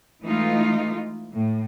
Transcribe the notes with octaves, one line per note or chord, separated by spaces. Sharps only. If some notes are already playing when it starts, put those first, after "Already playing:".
E3 G#3 A3 D#4 F4
A2